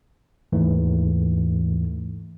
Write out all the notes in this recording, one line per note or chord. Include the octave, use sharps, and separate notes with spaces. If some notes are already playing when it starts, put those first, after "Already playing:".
D#2 G#2 E3 A3